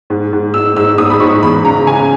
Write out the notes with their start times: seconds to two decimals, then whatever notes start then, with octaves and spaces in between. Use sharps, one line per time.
0.10 G#2
0.33 G#2
0.54 G#2 E6
0.76 G#2 E6
0.98 G#2 D#6
1.10 B5
1.20 G#2 C#6
1.43 E2 B5
1.64 C#3 A#5
1.87 C#3 G#5